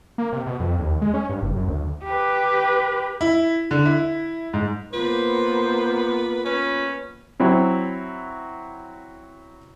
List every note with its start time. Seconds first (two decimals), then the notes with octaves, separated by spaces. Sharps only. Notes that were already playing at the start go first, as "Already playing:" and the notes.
0.18 A#3
0.32 C3
0.47 B2
0.60 F2
0.79 D#2
1.02 G#3
1.14 C#4
1.29 G2
1.42 F#1
1.56 F#2
1.68 D2
2.04 G4 B4
3.21 E4
3.71 D3
3.86 E4
4.53 G#2
4.93 A#3 B3 F4 B4 C5
6.45 C#4 B4
7.40 F#3 C4 E4